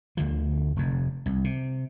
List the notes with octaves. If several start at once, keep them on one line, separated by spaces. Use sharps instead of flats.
D2 D3 F3
F1 F2
C2
C3